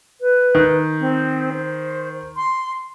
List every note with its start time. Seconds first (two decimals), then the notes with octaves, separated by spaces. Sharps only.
0.21 B4
0.55 D#3
1.01 C4
1.52 C5
2.36 C6